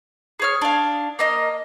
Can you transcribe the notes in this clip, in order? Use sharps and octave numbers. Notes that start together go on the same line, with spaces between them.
G#4 C#5 F6
D4 F5
A#3 D#5 F6